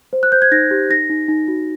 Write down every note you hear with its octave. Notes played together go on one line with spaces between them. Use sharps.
C5
F#6
C5 G6
G#6
D#4 A#6
G4
D#4 A#6
D#4
D#4
F#4